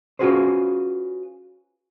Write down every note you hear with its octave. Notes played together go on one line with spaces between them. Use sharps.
C#4 F4 F#4 G#4 B4 C5